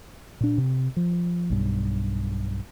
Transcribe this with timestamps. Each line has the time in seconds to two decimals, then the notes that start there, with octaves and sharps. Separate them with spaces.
0.41 A#2 D4
0.58 C3
0.96 F3
1.50 B1 G2